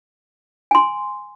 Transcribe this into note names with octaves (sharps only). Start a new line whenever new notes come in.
G#5 C6